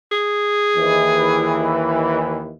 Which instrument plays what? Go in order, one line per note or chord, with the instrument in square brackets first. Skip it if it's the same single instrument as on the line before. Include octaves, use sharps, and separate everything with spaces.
[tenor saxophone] G#4
[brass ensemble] D#2 E3